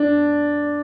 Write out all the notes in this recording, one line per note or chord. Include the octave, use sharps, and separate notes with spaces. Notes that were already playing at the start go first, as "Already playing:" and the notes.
Already playing: D4